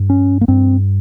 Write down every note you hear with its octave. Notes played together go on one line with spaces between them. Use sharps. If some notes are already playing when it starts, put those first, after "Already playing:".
Already playing: G2
C#4
A#3
G2 C4